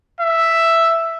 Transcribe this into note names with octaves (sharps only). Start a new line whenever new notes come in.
E5